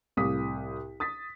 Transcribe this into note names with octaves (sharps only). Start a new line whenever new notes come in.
C2 A2 F5 D6 D#6 B6
D#6 A6 B6